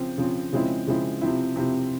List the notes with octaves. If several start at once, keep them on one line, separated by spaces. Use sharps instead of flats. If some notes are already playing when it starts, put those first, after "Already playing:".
Already playing: C#3 F3 C4
C#3 F3 C4
C#3 F3 G#3 C4 E4
C#3 F3 G#3 C4 E4
C3 F3 C4 E4
C3 F3 C4 E4